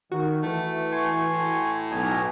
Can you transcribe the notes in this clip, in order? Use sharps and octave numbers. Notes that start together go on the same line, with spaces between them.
D#3 F#4
E3 A3
G#5 C6 C#6
A2
B1 D#5 G#5 A#5